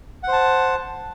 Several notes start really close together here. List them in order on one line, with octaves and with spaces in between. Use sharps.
F#5 C5 A5